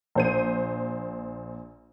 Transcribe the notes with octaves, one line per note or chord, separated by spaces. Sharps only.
A#1 C5 D#7